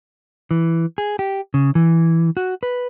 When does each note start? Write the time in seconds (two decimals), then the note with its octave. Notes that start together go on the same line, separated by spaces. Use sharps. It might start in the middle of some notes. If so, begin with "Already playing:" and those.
0.51 E3
0.98 G#4
1.19 G4
1.54 C#3
1.75 E3
2.37 F#4
2.63 B4